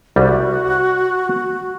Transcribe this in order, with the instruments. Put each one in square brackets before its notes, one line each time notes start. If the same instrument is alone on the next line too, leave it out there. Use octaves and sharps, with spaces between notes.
[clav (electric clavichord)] C2 G3 [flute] F#4